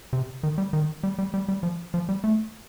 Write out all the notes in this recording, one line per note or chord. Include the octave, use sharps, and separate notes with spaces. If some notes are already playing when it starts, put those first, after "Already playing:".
C3
D#3
G3
D#3
G3
G3
G3
G3
F3
F3
G3
A3